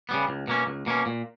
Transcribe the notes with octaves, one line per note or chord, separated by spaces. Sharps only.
C#3 G3 B3
C#2
B2 A#3 C#4
C#2
B2 A#3 C#4
A#2